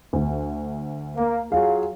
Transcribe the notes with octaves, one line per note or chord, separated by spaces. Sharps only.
D2
A#3
F#3 F4 G#4 F5